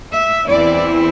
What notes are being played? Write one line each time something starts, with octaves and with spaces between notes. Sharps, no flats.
E5
E2 E3 C4 E4 D5